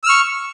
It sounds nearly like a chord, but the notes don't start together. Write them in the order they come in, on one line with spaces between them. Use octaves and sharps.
E6 F6 C#6